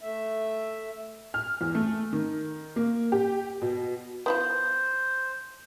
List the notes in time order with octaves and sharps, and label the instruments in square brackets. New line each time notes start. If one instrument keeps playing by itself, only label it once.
[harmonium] A3 E5
[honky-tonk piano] F6
E2
A3
D#3
A#3
G4
B2
[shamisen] B3 E4 F4 [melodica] C5